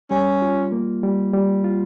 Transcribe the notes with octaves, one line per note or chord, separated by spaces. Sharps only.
G3 C#4
F4
A#3
G3
G3
F4